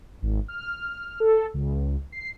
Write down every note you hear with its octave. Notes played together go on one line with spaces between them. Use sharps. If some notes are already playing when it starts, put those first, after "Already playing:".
G#1
F6
A4
C#2
C7